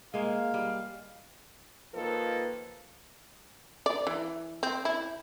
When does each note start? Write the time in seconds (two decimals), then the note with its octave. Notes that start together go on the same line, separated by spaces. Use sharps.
0.14 G#3 A#3 F5
0.54 G3
1.94 D#3 F3 A#3 A4 B4
3.86 D5
4.07 E3
4.63 C4
4.85 E4